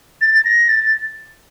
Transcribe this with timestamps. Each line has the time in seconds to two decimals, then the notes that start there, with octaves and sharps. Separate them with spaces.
0.21 A6
0.35 A6
0.45 A#6
0.69 A6